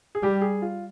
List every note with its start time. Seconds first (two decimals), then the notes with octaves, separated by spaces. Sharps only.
0.15 G#4
0.22 G3 G4
0.41 G#4
0.62 F4